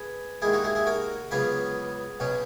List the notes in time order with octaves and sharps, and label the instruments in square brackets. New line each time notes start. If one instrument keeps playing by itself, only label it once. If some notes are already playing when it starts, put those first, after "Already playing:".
Already playing: [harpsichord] G#4 B4
D#2 D#3 G#3 E4 G#4
D#4 F#4
E4 G#4
E4 G#4
F#4 A#4
C#2 C#3 F#3 B3 G#4 B4
B1 B2 F#3 C#4